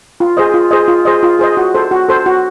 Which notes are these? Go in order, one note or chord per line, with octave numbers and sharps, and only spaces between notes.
F4
G#4 C5 D#5
F4
G#4 C5 D#5
F4
G#4 C5 D#5
F4
G#4 C5 D#5
F#4
A4 C5
F#4
A4 C5
F#4